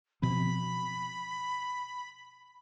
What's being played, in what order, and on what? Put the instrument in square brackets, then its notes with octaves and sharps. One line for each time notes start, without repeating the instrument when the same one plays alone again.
[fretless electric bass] B2 F3 C4 [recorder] B5